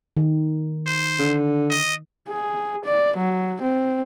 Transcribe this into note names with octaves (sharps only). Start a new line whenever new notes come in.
D#3
C5
D3
D#5
G#4
D5
F#3
C4